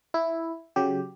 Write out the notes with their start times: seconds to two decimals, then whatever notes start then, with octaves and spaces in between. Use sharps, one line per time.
0.14 E4
0.76 C#3 F#3 G4